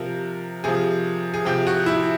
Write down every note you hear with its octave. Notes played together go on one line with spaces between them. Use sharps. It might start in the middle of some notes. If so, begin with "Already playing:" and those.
Already playing: C3 F3 A#4
C3 F3 G#4
G#4
C3 F3 G4
F#4
E4